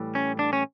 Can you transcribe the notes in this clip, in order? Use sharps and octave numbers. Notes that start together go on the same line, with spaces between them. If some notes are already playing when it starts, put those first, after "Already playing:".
Already playing: A2 E3 G3
C#4
D4
C#4